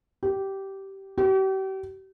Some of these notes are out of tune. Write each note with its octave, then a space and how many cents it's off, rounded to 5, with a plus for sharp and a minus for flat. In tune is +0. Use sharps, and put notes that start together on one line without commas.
G4 -15
G4 -40